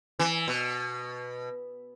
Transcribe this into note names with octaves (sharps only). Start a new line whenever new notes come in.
E3
B2